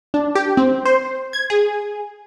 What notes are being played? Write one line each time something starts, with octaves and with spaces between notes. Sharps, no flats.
D4
G4
C4
C5
G#6
G#4